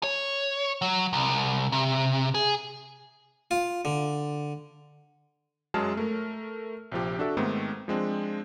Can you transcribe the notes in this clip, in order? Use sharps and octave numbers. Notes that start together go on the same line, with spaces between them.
C#5
F#3
C2
C3
G#4
F4
D3
F#2 F#3 G#3 G#4 A5 F6
A3 A#4
A#1 C3 F3 G4
D4 F#4 A4 E5
G#2 D#3 A3 B3 C4
F3 G#3 C4 D4